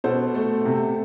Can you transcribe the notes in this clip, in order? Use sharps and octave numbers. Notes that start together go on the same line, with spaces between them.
B2 A4 C5
A3
C3